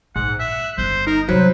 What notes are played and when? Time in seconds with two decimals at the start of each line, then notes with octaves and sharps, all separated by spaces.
0.16 A#1 G#2 F#5
0.40 E5 F#6
0.78 G1 C#4 C5
1.07 D#4 A#4
1.29 G2 C3 F#3 B4 C5